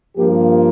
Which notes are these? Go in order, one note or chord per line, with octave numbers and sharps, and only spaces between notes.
G2 F3 A#3 G4